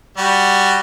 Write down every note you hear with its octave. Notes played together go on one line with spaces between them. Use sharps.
G3 F#4